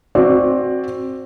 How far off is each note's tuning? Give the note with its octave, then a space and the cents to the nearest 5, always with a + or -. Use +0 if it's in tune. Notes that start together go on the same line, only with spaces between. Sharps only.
C4 +15 F#4 +0 D5 +0